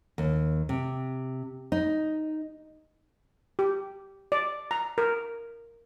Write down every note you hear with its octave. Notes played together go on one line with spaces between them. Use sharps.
D#2
C3
D#4
G4
D5
A#5
A#4